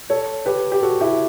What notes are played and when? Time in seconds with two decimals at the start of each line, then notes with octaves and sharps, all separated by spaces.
0.10 A4 C#5
0.46 G4 B4
0.72 G4
0.82 F#4 A4
1.01 E4 G4